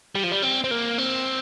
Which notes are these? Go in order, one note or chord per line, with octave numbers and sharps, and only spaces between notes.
G3
F3
G3
C4
C4
A#3
C4